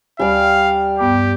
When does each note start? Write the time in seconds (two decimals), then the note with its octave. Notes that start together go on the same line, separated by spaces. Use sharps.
0.19 D2 G3 D5 F5 G#5
0.99 G2 B3 G4 D6